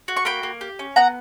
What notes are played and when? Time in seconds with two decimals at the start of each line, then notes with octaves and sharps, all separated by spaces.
0.08 F#4
0.17 C#6
0.25 A#3 G5 B5
0.43 A#3
0.61 G4
0.79 C#4
0.96 B3 F#5 A#5